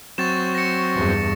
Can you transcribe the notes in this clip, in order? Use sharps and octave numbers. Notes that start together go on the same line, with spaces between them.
F#3 C4 C#6 A6 E7
A#6 C#7
E2 G2